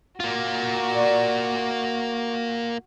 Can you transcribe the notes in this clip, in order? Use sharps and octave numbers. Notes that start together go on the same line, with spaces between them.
A#3 F4 F#4
A#4 D5